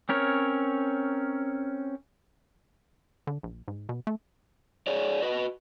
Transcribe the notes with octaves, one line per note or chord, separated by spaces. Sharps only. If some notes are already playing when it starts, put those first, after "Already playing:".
C4 C#4 A#4 C#5
D3
A#1
G#2
B2
A3
G#4 C#5 D5
F#4 B4 D#5